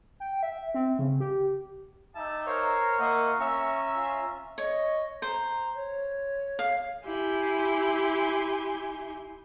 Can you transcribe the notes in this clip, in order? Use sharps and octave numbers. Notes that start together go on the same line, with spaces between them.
G5
E5
C4
C#3
G4
D#4 G4 E5 A5
A#4 C5 C#5 F5 A#5 C#6
A#3 F4 D#5 E5 F#5
C#4 E5 A#5 C#6
F4
C#5 D#5
C5 A#5
C#5
F5
E4 G4 G#5 C6